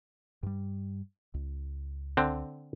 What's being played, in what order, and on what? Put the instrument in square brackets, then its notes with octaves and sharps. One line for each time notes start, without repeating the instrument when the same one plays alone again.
[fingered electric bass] G2 G3
C#2
[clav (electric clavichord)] D3 C4